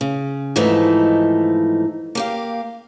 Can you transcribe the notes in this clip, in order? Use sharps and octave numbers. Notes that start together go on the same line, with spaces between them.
C#3
G#2 E3 F3 A3 D#4
A#3 G4 F5